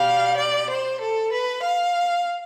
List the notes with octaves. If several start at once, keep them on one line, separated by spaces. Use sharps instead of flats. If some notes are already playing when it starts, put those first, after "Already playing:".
Already playing: B2 G3 F5
D5
C5
A4
B4
F5